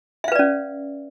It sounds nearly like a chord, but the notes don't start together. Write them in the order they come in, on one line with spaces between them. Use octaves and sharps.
E5 F5 B4 D5 C#4